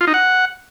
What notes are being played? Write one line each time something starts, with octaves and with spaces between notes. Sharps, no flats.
F4
D#4
F#5